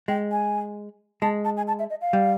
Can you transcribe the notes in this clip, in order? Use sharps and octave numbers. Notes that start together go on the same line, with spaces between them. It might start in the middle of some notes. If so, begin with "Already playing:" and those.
G#3 G5
G#5
G#3 A5
A5
G#5
A5
E5
D#5
F5
G3